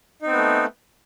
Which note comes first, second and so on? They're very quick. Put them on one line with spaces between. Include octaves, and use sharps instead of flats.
D#4 C4 B3 A3